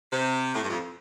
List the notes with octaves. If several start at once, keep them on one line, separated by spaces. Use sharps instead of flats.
C3
A2
G2
F2